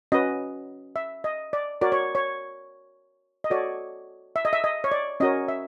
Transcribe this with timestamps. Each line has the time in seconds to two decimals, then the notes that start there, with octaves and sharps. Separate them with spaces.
0.12 C#4 F#4 B4 D#5
0.96 E5
1.24 D#5
1.53 D5
1.81 F#4 A#4 C#5 D5
1.92 C#5
2.15 C#5
3.44 D#5
3.50 F#4 A4 C#5 D5
4.36 E5
4.45 D#5
4.53 E5
4.64 D#5
4.84 C#5
4.92 D5
5.20 C#4 F#4 A#4 C#5 D#5
5.48 E5